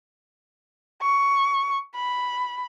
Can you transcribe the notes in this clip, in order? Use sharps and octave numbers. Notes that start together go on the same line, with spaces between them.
C#6
B5